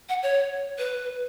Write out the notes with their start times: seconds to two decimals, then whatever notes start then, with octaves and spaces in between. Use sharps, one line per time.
0.09 F#5
0.23 C#5
0.78 B4